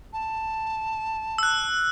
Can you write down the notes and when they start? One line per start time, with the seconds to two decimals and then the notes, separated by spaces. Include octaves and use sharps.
0.13 A5
1.38 E6 F#6